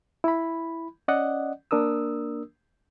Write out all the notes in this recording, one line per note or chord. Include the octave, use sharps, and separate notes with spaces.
E4 B5
C#4 D5 D#5 F#5
A#3 D4 A#4 D#6 E6